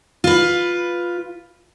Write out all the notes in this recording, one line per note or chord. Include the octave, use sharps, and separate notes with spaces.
F4 B4